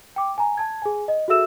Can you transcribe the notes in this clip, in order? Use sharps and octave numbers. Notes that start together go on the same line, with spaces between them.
G5 D6
G#5 A#5
A5 G#6
G#4 G#5
D#5
F#4 G#4 A4 E5 E6 E7